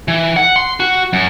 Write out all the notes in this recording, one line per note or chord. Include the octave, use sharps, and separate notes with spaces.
E3
F#5
C6
F#4
F#2